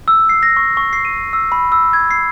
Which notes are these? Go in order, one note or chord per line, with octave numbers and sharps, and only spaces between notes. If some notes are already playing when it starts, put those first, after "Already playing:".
E6
C7
A#6
C#6
C#6
C7
D#7
E6
B5
E6
G#6
C7